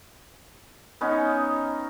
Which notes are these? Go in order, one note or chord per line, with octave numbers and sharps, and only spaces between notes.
B3 C#4 D#4